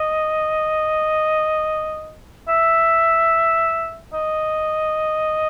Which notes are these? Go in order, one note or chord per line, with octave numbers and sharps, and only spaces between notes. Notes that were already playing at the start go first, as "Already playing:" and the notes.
Already playing: D#5
E5
D#5